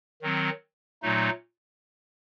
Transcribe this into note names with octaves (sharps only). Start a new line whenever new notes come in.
D#3 F#3 C4
A#2 F#3 A3 D#4